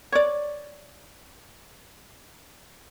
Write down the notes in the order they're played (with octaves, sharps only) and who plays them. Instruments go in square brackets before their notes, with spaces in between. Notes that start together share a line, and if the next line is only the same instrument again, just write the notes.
[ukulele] C#5 D5